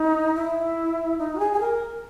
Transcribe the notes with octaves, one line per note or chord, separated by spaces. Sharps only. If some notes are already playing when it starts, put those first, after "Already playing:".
Already playing: D#4
E4
D#4
F#4
G#4
G#4
A#4